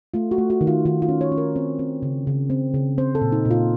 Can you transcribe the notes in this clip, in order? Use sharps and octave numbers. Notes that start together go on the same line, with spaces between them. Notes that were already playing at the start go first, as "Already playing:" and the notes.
A3 F4
F#4
A3
F#4
D#3
F4
D#3 F4
F4
C#4
C#5
C#4
A#4
C4
C4
C#3
C#3
C4
C#3
C4 C5
A4
A#2
D#4
A#2
F4